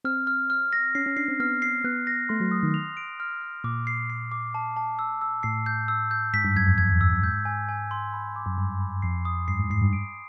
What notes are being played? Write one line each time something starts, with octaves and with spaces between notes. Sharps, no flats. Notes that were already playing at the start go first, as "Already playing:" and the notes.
C4 F6
F6
F6
A#6
C#4 C7
C#4
D4 C7
C4
B3 F6
C7
B3 F#6
A#6
A3 C6
F#3
D#6
D#3
F7
D7
F6
F6
A#2 D6
C7
C7
D6
A5
A5
E6
E6
A2 C7
G6
E6
G6
G#2 B6
G2
F#2 G#6
F2
F2 G#6
E2
F2 E6
F#2
G#2 G6
G#5
G#5
C6
B5
D6
F#2
G2 B5
B5
F2 C7
D#6
G2 C7
G#2
G#2 C7
G2
D7